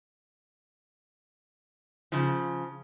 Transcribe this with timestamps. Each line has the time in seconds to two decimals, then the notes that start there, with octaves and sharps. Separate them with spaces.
2.12 C#3 F3